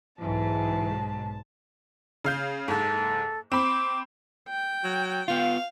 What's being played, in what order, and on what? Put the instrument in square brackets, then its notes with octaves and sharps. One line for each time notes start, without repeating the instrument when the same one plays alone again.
[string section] B1 G#2 [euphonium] E3 [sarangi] A5
[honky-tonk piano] C#3 F5 G6
[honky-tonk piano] F#1 G#2 [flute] A4
[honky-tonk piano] C4 B5 [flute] D6
[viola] G5
[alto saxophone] F#3
[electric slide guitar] B3 F4 [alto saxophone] F5